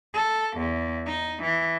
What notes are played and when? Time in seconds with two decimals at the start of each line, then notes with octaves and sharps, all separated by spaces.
0.14 A4
0.57 E2
1.07 D#4
1.42 E3